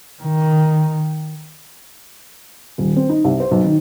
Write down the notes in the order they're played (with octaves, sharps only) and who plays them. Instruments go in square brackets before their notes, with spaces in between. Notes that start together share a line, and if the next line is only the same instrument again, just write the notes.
[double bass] D#3
[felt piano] D#1
C4
D#4
C2
C5
B1
D#3